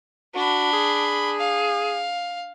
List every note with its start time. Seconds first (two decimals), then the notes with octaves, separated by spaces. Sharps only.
0.35 D4 F#4 B5
0.73 G#4
1.39 F5